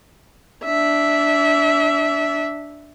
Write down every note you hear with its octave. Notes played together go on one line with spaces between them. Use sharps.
D4 E5